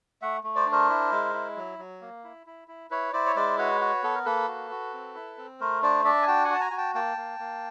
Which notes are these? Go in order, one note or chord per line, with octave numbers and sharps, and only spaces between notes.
A3 E5 F#5
A3
C5 D5
D4
A#4 C5
E4
G#3
E4
F#3
F#3
A#3
E4
E4
E4
E4 B4 C#5
E4 C5 D5
C#5
G#3 C5 D5
F#4 B4 C#5
F#4
B3 A4
A#4
A#3 A4 B4
F#4
F#4
C4
E4
C4
A3 A#4 C5
D4 C5 D5
D4 D5 E5
G#5
F#4 G5 A5
F#5 G#5
F#4 A5
G#5 A#5
F#4 G#5
G5 A5
A#3 G5 A5
A#3
A#3